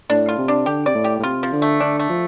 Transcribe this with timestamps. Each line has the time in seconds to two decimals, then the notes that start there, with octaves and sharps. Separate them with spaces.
0.10 A2 D4
0.29 F4
0.38 C3
0.48 D4
0.66 D3 G4
0.86 C3 D5
0.95 A2
1.04 G4
1.19 A2
1.24 C3 F4
1.43 F3
1.53 D3
1.62 A3
1.80 D3 D4
1.99 A3
2.09 F3